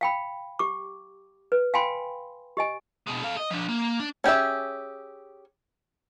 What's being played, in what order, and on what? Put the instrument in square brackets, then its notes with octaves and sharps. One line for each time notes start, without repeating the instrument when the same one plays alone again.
[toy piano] F5 G5 B5
G4 D6
B4
F5 G5 G#5 B5 C6
G4 D#5 G#5
[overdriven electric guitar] B2 G#3
A4 F5
D#5
F3 D4
A#3
D4
[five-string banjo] C#4 G4 G#4 E5